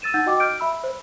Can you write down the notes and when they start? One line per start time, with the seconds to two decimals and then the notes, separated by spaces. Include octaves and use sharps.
0.02 E6 A6 D#7 E7
0.14 D#4 F#5 E6 G6 A6
0.26 F#4 D#5 G5 D6
0.40 F6 G6 D7
0.60 E5 B5 E6
0.84 C5